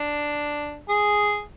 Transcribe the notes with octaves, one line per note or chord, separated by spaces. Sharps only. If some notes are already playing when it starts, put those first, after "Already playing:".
Already playing: D4
G#4